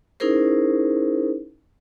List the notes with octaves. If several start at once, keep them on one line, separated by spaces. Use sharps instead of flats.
C#4 D#4 E4 G#4 A#4 C5